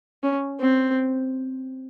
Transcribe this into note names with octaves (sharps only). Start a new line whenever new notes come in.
C#4
C4